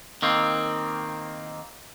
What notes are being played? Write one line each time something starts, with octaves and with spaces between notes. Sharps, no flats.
D#3 A#3 C4